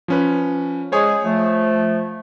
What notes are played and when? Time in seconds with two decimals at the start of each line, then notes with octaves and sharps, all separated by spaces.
0.08 F3 C#4 B4
0.92 G#3 G#4 C5 C#5 G#5
1.23 F3 A3